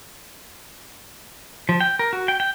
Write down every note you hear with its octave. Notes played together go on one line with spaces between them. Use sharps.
F3
G5
A#4
F#4
G5
G5